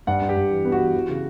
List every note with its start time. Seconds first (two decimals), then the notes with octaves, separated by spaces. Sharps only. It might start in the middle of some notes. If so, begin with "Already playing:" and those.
0.07 G2 F#5
0.21 G2
0.29 G4
0.36 G2
0.51 E3
0.65 B3
0.72 F#4
0.80 E3
0.95 E3
1.09 C#3